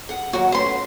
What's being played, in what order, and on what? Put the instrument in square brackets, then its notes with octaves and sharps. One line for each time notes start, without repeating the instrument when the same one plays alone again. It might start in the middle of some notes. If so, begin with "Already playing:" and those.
[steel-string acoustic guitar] G#4 F#5
[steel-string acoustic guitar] D#2 F#3 [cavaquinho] F#4
[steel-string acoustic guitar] A3 B3 C#4 [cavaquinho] C5 C6